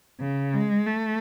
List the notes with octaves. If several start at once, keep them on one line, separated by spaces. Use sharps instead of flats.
C#3
G#3
A3